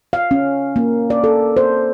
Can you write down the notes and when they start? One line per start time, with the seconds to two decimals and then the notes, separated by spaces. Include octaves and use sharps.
0.13 F5
0.31 C#4
0.76 A#3
1.10 D5
1.24 A4
1.57 C5